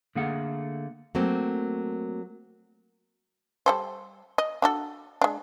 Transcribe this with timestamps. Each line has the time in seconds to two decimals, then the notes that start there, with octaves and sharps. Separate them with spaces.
0.15 D3 A3 A#3 G#4 F#5
1.15 F#3 A3 A#3 C4
3.66 G3 A4 C5
4.38 D#5
4.62 D4 F#4 A4
5.22 G#3 D4